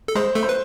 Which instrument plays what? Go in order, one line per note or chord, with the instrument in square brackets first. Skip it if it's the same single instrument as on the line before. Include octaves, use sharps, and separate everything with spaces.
[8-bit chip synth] A4
[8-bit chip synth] G#3 G#4 [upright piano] C5
[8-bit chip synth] A3 A4
[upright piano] C5
[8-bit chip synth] B4